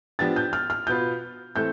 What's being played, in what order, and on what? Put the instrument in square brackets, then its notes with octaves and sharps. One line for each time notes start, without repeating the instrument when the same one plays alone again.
[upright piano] F3 B3 D4 G4 [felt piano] A6
[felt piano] G6
F6
F6
[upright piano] B2 B3 F4 B4 [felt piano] G6
[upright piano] E3 A3 C4 E4 A4 [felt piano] G6